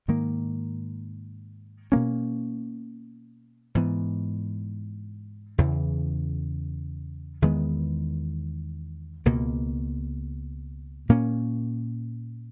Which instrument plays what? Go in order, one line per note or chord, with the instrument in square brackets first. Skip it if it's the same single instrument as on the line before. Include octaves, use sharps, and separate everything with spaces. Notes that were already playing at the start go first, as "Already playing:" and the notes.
[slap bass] G#2 D#3 A#3
B2 A#3 C#4
G#2 E3 B3
E2 C#3 E3
E2 D#3 G#3 B3
C#2 B2 A#3
A#2 A#3 C#4